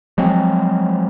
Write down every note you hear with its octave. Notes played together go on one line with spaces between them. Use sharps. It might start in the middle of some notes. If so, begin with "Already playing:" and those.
F3 F#3 G#3 C4